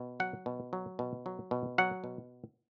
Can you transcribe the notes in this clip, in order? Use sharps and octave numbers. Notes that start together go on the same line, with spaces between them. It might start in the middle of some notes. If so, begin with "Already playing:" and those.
Already playing: B2
F#3 F#5
B2
F#3
B2
F#3
B2
F#3 F#5
B2